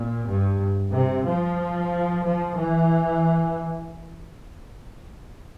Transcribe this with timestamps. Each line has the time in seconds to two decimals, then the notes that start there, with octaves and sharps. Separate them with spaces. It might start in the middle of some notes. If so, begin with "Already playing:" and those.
Already playing: A#2
0.26 G2
0.92 C3
1.24 F3
2.23 F3
2.56 E3